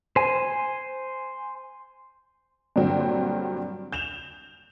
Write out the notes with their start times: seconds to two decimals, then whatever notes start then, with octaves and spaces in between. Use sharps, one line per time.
0.16 C5 G#5
2.76 G2 A#2 D3 F#3 C4
3.92 G6 E7 F7